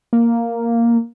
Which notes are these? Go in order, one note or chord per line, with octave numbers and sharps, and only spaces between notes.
A#3